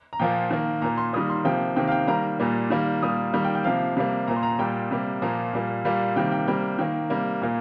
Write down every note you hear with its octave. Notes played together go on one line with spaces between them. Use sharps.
A#5
A#2 F3 A#3 G5
D#3 A#3
A#2 A#3 A#5
C6
D#3 G3 A#3 D#6
C6
C3 F3 A#3 G5
C3 D#3 A#3 G5
F5
G5
D#3 G3 A#3 A#5
A#2 G3 A#3
D#3 G3 A#3
A#2 G3 A#3 D#6
D#3 G3 A#3
G5
G5
C3 F3 A#3 F5
C3 G3 A#3
A#2 A#3 A#5
C6
A#5
A#2 G3 A#3 G5
C3 G3 A#3
A#2 F3 A#3 A#5
A#2 G3 A#3
A#2 G3 A#3
C3 D#3 G3 A#3 G5
G5
C3 G3 A#3 G5
D#3 A#3 G5
C3 G3 A#3
A#2 A#3